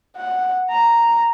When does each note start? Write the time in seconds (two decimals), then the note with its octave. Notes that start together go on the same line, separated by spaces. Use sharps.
0.17 F#5
0.70 A#5